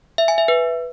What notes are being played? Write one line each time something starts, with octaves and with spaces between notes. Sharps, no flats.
E5
G#5
E5
B4